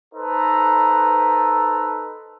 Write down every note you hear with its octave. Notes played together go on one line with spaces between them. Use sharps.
D#4 A4 B4 C5 A#5